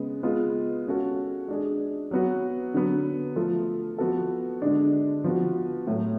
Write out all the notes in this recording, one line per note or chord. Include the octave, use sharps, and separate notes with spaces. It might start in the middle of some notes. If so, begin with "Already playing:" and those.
Already playing: C#3 G#3 B3
G#3 B3 F4 G#4
G#3 C#4 F#4 A4
G#3 D4 G#4
F#3 B3 F#4
D3 F#3 B3
F3 A3 F4 A4
F3 B3 F#4 A4
D3 G#3 D4
F3 B3 F#4
A2 F#3 A3